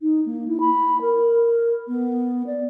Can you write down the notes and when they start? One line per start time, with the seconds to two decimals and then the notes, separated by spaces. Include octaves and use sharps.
0.02 D#4
0.26 A#3
0.48 E4
0.60 B5
1.01 A#4
1.88 B3
2.47 D5